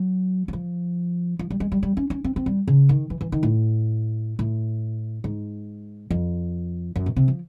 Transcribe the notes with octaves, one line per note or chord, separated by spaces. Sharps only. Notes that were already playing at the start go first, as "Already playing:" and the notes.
Already playing: F#3
F#3
F3
F3
G3
G#3
G3
G3
C#4
C#4
C4
C4
G3
C#3
D#3
E3
E3
D#3
A2
A2
G#2
F2
F#2
B2
C3
F3